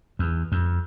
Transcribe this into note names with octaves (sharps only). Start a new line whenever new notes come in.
E2
F2